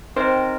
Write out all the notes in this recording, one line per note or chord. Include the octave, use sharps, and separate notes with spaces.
C4 D#4 A#4 C5 D#5 G5